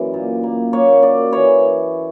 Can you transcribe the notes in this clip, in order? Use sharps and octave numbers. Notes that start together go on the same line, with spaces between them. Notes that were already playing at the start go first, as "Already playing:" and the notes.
Already playing: F#2 E3 A#3 D5
A#2
A#3
A#3 C#5
F#2 D5
E3 C#5